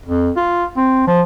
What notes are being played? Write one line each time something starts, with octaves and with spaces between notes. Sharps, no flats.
F2
F4
C4
F3